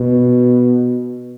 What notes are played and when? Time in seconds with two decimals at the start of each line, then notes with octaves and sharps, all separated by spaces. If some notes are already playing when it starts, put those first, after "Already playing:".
Already playing: B2